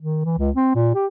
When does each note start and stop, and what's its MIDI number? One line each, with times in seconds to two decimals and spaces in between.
0.01 0.23 51
0.25 0.37 52
0.38 0.50 37
0.56 0.74 60
0.75 0.93 46
0.95 1.06 67